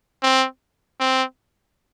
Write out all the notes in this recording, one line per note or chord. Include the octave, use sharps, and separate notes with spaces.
C4
C4